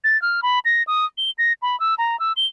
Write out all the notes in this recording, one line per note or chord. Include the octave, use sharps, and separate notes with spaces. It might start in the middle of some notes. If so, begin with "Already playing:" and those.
A6
F6
B5
A#6
D#6
G7
A#6
B5
E6
A#5
E6
G7